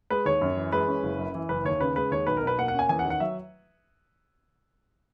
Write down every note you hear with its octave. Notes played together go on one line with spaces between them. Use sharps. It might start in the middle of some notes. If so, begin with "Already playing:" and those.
G#3 B4
D#2 C#5
F#2
E3
G#3 B4
C#4
F#1
F#2
E3
F#1 B4
D#2 C#5
C#3 B4
G#3 B4
D#2 C#5
B1 B4
A#4
B2 B4
A#3 F#5
F#5
C#4
G#5
E2 G#5
F#5
D#3
F#5
F#3 E5